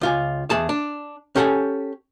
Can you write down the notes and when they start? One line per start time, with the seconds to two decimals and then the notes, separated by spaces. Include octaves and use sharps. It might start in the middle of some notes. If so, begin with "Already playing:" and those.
0.01 C#2 F4 G#5
0.50 E2 G#4 A5
0.69 D4
1.36 C#4 G4 A4 F#5 G#5